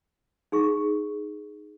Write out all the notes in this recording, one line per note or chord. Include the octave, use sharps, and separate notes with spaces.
D#4 G#4 C#6